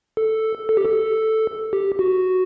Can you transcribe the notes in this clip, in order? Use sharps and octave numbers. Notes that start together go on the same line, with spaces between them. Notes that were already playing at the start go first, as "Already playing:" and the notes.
A4
A4
G4
A4
G4
F#4